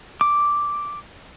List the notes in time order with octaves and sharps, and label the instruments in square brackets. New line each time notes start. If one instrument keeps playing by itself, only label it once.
[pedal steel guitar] D6